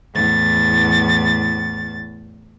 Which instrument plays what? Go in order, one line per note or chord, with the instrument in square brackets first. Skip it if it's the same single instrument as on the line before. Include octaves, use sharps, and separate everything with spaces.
[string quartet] E2 A2 A6